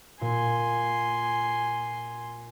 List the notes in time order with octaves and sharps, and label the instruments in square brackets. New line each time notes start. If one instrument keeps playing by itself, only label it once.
[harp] A#2 [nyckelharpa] G#5 C6